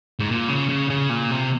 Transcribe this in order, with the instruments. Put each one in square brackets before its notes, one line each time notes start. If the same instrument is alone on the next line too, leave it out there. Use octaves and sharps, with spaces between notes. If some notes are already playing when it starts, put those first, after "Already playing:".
[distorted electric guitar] G#2
A#2
C#3
C#3
C#3
A#2
C3